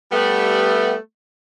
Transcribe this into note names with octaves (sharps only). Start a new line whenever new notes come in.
G3 A3 B3